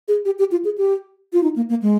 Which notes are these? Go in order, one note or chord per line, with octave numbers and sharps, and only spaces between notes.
G#4
G4
G4
F4
G#4
G4
F4
D#4
A#3
A#3
G#3